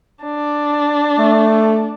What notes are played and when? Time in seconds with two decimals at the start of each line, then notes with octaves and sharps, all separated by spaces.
0.24 D4
1.19 A3